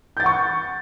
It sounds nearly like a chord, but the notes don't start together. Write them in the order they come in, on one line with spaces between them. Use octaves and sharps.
G6 A6 F#5 C#6